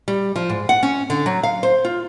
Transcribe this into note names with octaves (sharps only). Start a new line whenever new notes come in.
G3
F3
G#2
F#5
C#4
D3
F#3
F5
C5
F4